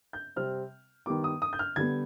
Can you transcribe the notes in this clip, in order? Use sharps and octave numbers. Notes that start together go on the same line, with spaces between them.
G6
C3 G3 C4 F6
D#3 G3 B3 D6
D#6
D#6
G6
F6
D3 G3 B3 G#6